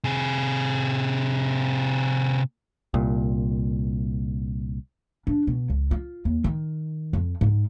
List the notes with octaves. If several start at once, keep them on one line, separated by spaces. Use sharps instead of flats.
C3 G#4
C2 A#2
D4
B2
C#2
F4
D#2
D#3
F2
G#2